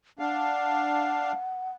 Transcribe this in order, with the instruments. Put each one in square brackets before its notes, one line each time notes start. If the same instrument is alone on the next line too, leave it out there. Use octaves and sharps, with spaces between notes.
[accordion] D4 F5 [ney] F#5